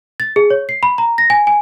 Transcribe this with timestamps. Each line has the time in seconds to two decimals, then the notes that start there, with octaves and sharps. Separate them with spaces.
0.20 A6
0.36 G#4
0.50 C#5
0.69 C7
0.83 B5
0.98 A#5
1.18 A#6
1.30 G#5
1.47 G#5